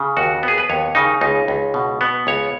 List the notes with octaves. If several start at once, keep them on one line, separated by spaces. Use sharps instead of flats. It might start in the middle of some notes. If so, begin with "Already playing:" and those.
Already playing: C#3
D#2 F#4
B3 G#4
B4
D#2 C#5
C#3 D#4
C#2 D#4
C#2
B2
B3
C#2 C#5